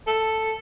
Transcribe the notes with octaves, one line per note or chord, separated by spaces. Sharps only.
A4